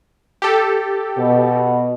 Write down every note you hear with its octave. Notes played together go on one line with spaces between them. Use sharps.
G4 A4
B2